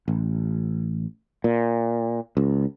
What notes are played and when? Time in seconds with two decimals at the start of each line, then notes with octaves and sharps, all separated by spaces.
0.08 A1
1.44 A#2
2.37 C#2